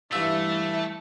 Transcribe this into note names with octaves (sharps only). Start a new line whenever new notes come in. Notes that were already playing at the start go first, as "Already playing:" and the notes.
G2 E3 A3 F4 E5